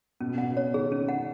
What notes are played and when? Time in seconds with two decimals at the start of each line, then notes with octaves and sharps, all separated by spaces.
0.21 B2 C#4
0.38 B2 F#5
0.47 C#3
0.57 C#5
0.74 D#3 G#4
0.92 C#4
1.09 F#5